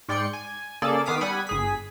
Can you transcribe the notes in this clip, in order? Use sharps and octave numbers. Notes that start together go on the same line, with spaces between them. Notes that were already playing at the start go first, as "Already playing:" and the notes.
G#2 D5 G5 C6 C#7
G#5
C#3 A#3 G#4 A4 D5 A6
D#3 B3 F5 D6 D#6 B6
G3 F#5 G#5 B5 D#6
G1 G#4 B6